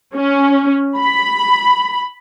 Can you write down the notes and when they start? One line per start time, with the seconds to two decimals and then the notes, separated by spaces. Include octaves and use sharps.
0.15 C#4
0.98 B5